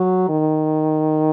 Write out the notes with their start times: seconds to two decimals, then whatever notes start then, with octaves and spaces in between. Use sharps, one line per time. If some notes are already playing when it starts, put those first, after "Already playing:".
Already playing: F#3
0.29 D#3